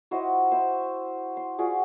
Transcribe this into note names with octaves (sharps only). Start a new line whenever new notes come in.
E4 F#4 C5 D#5
C5 E5 B5
C6
F4 F#4 G#4 D5